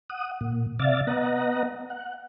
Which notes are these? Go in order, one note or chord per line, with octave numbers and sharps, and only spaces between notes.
F#5 D#6
A#2
C3 D5 E5 F5 A6
B3 D#5 F#5 A#5
F#5